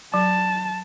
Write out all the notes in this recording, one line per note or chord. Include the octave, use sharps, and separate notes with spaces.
F#3 A5